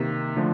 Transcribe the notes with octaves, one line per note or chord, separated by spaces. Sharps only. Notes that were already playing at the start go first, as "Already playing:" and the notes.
Already playing: C3 D#3 A#3
D3 F3 A3